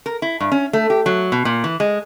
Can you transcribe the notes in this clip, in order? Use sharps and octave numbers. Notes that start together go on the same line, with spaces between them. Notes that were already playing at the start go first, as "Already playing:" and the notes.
A#4
E4
G2
C#4
A3
G4
F#3
B2
A#2
E3
G#3